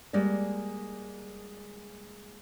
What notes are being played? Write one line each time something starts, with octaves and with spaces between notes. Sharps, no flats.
G3 G#3 A#3 D5